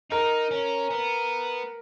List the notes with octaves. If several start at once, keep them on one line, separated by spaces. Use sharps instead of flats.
D#4 A#4
C#4
B3